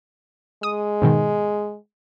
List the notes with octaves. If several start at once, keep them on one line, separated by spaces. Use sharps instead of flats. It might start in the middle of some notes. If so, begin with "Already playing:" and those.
G#3 D#6
G#2 B2 D#3